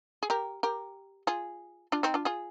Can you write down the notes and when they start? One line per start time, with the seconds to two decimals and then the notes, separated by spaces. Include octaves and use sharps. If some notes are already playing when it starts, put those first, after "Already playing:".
0.23 G#4
0.30 G4 A#4
0.63 G4 A#4
1.27 F4 G#4
1.92 D4 F4
2.03 C4 D#4
2.14 D4 F4
2.25 F4 G#4